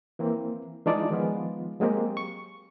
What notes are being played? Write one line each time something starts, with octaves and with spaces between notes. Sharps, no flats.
E3 A#3 C4
E3 G#3 D4 D#4 F4 D5
D#3 F3 G#3 B3 F4
F#3 G#3 A#3 C4 G4
C#6